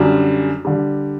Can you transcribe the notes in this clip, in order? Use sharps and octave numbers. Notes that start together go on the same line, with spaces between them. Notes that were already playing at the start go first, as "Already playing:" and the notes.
Already playing: F#2 D3 G3
D3 G3